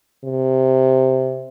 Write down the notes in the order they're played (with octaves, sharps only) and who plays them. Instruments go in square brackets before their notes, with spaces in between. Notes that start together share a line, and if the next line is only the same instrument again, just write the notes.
[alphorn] C3